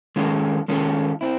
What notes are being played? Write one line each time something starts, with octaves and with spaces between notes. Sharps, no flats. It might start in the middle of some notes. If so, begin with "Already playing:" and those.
D#3 G#3 C#4 F4 A4
D#3 G#3 C#4 F4 A4
C4 E4